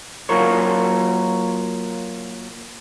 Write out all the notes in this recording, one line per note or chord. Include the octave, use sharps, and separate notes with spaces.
F#3 A#3 F4 A#4 C#5